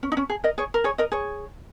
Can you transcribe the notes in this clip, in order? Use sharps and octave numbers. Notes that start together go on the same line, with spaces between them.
C#4
D#4
C#4
G#4
A#4 D#5
G#4 C#5
A#4
G#4 C#5
A#4 D#5
G#4 C#5